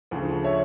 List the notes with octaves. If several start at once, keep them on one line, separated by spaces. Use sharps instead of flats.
D2 C#3 F3
C#5 E5